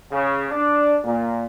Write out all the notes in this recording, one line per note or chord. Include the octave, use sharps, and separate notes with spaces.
C#3
D4
A#2